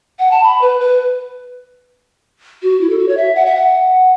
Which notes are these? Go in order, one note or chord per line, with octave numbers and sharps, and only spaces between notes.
F#5
A5
B5
B4
B4
F#4
E4
A4
F#4
C#5
E5
F#5
E5
F#5